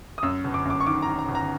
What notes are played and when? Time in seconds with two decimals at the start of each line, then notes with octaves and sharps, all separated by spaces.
0.18 D#6
0.23 F#2 E6
0.44 G1
0.54 D6
0.65 F#2 D6
0.80 C#6
0.87 D#3 D6
1.02 A#5
1.07 D#3
1.19 A#5
1.28 G1
1.35 A#5